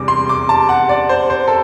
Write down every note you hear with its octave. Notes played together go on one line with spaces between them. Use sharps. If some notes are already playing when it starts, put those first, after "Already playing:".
Already playing: E2 C3 G3 D6
C6
D6
A5
F#5
D5
C5
C5
A4